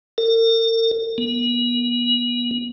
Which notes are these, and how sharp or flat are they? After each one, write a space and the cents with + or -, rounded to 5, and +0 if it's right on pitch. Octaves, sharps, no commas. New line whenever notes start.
A#4 -45
B3 -35